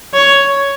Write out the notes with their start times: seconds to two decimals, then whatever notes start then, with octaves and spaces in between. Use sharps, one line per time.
0.14 C#5